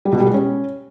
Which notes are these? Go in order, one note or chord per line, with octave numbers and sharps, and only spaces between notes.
G3
B2
G3
G#3
C#4